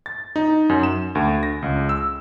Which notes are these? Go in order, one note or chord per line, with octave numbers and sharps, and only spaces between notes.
A6
D#4
F#2
E7
D2
A#6
C#2
E6